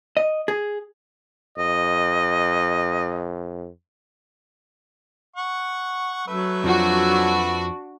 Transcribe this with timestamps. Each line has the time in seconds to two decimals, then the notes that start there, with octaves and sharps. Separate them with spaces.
0.17 D#5
0.48 G#4
1.58 F2 D#5
5.36 F#5 C#6
6.28 F#3 A3 B4 E5
6.64 F2 F3 D4 F#4